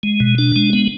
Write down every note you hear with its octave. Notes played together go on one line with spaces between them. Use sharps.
G#3
B2
D4
G#3
B3